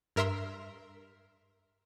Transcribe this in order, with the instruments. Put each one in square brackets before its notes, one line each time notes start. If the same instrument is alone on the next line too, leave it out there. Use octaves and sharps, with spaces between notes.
[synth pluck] G2 A#4 E5 A#5 C6 E6